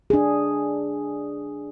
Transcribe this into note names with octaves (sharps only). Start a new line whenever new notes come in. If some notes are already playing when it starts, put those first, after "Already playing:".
D4 G#4